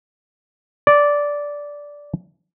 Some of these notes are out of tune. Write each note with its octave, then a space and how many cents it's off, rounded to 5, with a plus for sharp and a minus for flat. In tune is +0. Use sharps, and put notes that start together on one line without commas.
D5 -10